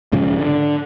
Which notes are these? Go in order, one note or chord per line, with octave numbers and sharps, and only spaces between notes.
B1 G#2 C#3 F3
D3